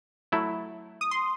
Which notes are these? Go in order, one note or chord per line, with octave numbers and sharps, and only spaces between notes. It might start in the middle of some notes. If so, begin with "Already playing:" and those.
F#3 A3 E4
D#6
C6